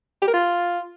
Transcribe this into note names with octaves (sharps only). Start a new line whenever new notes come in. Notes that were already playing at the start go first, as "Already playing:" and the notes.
G4
A#4
F4